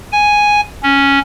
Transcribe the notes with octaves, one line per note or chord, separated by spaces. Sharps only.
G#5
C#4